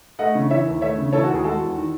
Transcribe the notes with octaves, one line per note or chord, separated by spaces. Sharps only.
A3 D#5 F#5
C#3
E3 C#5 E5
D#2
A3 C#5 E5
C#3
E3 A4 C#5
F#4
D#2 G#4
G#3 F#4 A4
E2
D#3